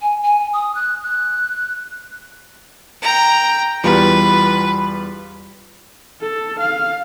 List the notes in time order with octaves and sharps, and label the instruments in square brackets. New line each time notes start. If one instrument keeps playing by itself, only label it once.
[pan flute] G#5
G#5
D#6
F#6
F#6
[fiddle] G5 A#5
[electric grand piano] E2 G3 F4 [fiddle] B4
[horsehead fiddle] A4
F5